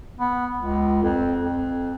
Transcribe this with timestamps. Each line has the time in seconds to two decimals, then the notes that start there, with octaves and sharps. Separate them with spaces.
0.19 B3
0.59 C#2
1.03 F2
1.40 F2